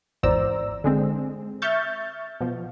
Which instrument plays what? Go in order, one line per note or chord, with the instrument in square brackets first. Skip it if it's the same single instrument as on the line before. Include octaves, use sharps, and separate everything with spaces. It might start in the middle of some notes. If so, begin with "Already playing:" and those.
[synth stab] G#1 E2 C5 D5 A#5 E6
D3 G#3 C4
E5 C#6 F6 G6 A6
B2 F3